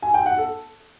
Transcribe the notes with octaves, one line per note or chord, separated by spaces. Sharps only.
G#5
G5
F#5
A4